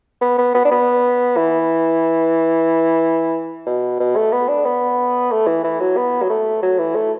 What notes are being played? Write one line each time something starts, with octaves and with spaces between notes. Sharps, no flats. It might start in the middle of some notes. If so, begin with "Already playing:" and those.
B3
B3
B3
D4
B3
E3
B2
B2
A3
B3
D4
B3
A3
E3
E3
F#3
B3
F#3
A3
F#3
E3
A3